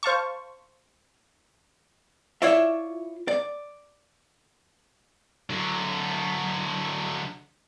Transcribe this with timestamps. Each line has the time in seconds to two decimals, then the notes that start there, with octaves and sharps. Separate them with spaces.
0.03 C5 F5 A5 C#6
2.42 E4 F4 C#5 D5 E5
3.28 D5
5.50 D3 F#3